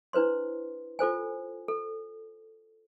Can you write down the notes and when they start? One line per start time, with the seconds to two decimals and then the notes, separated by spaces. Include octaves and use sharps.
0.13 D4 E4 B4 C5 C6
0.99 F4 A4 C5 G#5
1.68 A4